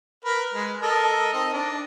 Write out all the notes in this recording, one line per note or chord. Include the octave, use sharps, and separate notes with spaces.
A#4 B4
G#3 B4
A4 A#4 D#5
C4 D#4 D#5
D4